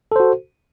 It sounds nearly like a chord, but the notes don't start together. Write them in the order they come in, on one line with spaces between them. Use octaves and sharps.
A4 C5 F#4